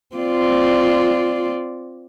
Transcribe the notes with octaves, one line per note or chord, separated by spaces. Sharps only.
C4 F4 D5